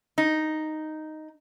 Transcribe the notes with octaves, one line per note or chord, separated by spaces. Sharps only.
D#4